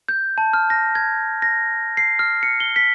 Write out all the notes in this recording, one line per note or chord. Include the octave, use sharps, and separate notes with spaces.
G6
A5
F6
A#6
G#6
A#6
C7
F6
C#7
G7
B6